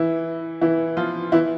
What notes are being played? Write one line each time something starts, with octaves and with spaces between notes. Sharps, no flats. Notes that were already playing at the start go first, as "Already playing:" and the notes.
Already playing: E3 E4
E3 E4
F3 F4
E3 E4